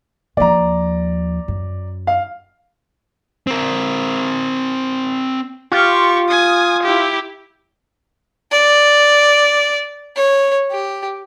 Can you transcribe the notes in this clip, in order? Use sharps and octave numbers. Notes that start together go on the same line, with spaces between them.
D#2 F3 D5 A#5
F#2
F5
C4 A#4
F4 G4 C#6
G#5 D#6
E4 G4
D5
C#5
G4